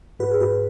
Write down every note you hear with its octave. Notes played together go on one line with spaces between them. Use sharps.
G#2 F#4 B4
G#4
G#2 F#4 B4